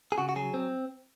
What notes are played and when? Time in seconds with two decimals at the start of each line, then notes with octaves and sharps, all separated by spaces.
0.12 G#4
0.18 C#3 F#4
0.29 F#4
0.36 F#3 G#4
0.54 C4